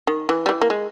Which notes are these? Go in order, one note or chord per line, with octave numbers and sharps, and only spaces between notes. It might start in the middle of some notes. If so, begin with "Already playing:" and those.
D#3
E3
G3
E3
A#3
G#3